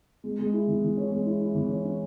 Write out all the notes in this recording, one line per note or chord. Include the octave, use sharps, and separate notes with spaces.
G#3
G#3
E4
E3
E3
C#4
G#3
E4
E4
E3
C#4
C#4